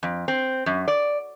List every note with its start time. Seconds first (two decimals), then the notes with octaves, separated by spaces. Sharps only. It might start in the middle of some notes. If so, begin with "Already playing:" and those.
0.03 F2
0.28 C4
0.66 F#2
0.88 D5